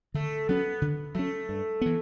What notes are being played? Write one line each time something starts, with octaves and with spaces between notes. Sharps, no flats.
D3 A3
F#3 B3 C#4
D3
F#3 A3 C#4
G2
E3 B3